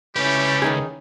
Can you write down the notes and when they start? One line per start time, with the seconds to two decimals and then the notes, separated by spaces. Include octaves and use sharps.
0.16 C#2 G3 A3 C#4 E4 G4 B4
0.62 D#3 D#4 G#4